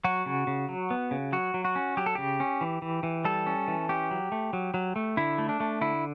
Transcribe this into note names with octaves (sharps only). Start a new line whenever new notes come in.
F#3 F#4
C#3
C#3
F#3
B3
C#3
F#3 F#4
F#3
F#4
C#4
F#3 G4
A4
C#3 G4
C#4
E3
E3
E3
G3 A4
C#4
E3
C#4 G4
F#3
A3
F#3
F#3
A3
D3 E4
A3
D4
A3
D3 E4